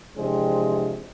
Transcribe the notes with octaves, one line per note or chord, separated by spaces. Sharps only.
C3 E3 F3 G#3 C4 D4